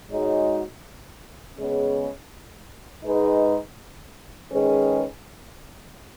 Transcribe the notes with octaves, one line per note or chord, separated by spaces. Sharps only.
G#2 G#3 D#4 F#4 C#5
C#3 G#3 B3 G#4 C#5
G#2 G#3 D#4 B4 D#5
D#3 G#3 C#4 G#4 B4